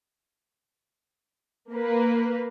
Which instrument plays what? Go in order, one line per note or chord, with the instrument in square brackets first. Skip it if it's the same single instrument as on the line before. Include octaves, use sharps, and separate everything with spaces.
[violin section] A#3 B4